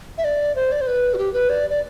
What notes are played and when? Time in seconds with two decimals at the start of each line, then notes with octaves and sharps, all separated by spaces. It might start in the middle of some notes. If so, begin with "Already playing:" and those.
0.18 E5
0.24 D5
0.56 C5
0.72 D5
0.81 C5
0.87 B4
1.14 F#4
1.18 G4
1.33 B4
1.49 D5
1.70 D5